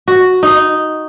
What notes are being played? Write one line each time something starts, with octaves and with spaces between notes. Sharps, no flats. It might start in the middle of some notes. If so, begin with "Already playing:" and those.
F#4
D#4